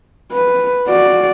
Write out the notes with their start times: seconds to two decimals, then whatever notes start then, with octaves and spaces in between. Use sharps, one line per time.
0.32 B4
0.88 F#4 D5